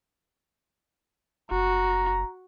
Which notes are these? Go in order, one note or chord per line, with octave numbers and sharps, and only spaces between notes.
F#1 F#4 A#5